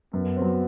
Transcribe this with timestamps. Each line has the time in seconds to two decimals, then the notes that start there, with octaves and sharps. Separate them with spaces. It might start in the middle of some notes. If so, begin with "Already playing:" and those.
0.13 F#2 B3
0.37 F#3 C4